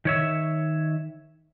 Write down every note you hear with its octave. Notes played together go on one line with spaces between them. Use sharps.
D#3 C#5 E5